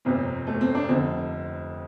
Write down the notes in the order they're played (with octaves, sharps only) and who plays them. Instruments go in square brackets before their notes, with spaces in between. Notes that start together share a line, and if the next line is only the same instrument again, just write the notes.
[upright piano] G1 F2 C3 C4
A3
C4
D4
F1 F2 D3 C4